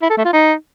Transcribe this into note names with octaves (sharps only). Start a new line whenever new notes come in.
E4
A4
A3
F4
D#4